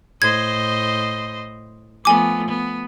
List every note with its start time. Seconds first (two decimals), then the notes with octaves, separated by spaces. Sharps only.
0.22 A2 C5 D#5 G#6
2.05 F3 A3 B3 G#5 D6
2.49 B3